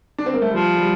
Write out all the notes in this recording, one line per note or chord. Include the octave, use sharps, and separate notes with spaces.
D4
C4
A#3
A3
F3 G3
G3